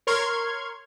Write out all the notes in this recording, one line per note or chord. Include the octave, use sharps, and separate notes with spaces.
A#4 C#5 C6 C#6 F6 G#6